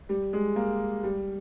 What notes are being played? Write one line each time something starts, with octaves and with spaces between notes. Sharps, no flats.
G3
G#3
A#3
G3